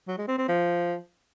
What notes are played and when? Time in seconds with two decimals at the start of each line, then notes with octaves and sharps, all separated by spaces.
0.08 F#3
0.18 G#3
0.28 C4
0.38 C4
0.48 F3